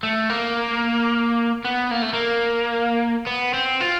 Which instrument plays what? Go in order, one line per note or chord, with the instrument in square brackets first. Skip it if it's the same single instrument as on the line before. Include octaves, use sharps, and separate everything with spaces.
[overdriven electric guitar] A3
A#3
B3
A#3
A3
A#3
B3
C4
F4